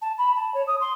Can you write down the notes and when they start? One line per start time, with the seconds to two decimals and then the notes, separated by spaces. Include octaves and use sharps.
0.02 A5
0.18 B5
0.36 A5
0.54 C#5
0.67 D#6
0.81 C6